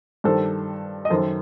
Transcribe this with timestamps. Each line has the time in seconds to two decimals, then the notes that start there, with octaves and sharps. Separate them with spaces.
0.24 G2 D#3 A4 C5
1.05 D#5
1.10 F#2 D#3 A4 C5